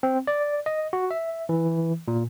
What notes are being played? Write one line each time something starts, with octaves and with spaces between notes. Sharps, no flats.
C4
D5
D#5
F#4
E5
E3
A#2